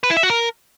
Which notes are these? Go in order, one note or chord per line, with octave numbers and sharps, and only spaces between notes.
B4
E4
E5
F#4
A#4